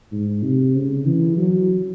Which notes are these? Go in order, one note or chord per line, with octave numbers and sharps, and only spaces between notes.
G#2
C3
C#3
E3
F#3